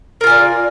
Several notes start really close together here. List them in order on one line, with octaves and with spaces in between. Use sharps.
A#4 F4 G#5 D5